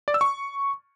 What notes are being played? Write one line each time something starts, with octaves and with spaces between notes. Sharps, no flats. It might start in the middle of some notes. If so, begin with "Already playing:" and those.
D5
E6
C#6